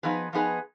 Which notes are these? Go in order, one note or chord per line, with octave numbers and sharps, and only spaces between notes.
F3 B3 D#4 G#4 B4
F3 B3 D#4 G#4 B4